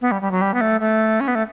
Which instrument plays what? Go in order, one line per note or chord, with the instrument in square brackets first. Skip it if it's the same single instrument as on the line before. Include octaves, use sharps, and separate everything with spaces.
[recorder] B3
G3
G3
F#3
G3
B3
A3
A3
C#4
B3
A3